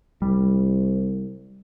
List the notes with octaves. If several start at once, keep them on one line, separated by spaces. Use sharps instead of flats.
C2 G3